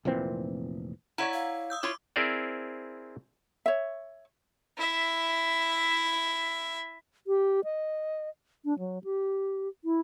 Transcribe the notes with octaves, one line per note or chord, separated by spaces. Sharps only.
F1 A#2 E3 C4
E4 C#5 D5 F#5 A#5
F5
D#6 E6 G6
E4 F4 C#5 D6
C4 E4 G#4 A#4 C5 D5
C#5 E5
E4 E5
G4
D#5
D4
F#3
G4
E4